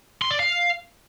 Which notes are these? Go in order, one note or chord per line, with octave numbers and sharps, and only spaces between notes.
C6
D5
F5